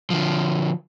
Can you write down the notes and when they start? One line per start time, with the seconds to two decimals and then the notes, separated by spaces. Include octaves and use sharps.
0.10 D3 F3